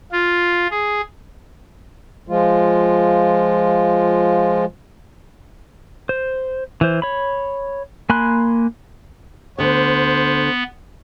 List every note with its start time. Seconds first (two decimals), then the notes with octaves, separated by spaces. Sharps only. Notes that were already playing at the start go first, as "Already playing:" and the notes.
0.12 F4
0.71 G#4
2.27 F3 G#3 F4
6.09 C5
6.81 E3 C5
7.02 C#5 B5
8.10 A#3 G#5 B5 C6 F#6
9.58 D2 D3 B3 C5 C#5